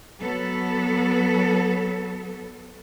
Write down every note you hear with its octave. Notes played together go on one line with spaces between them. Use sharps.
F#3 B3 A4